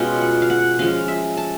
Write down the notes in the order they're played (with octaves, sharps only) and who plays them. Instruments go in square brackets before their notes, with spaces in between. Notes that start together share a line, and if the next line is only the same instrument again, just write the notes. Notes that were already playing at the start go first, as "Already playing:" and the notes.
Already playing: [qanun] B2 G#3 C#4 F4 G5
F#5
F5
F#5
F3 G#3 C#4 F5
E5
A5